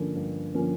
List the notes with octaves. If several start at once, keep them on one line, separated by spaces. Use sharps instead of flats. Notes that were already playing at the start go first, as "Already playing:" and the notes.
Already playing: G2 D3 F3 A#3 C#4
G2
D3 F3 A#3 C#4